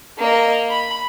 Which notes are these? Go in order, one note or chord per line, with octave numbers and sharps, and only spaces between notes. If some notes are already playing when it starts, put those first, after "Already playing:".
A#3 D#5
B5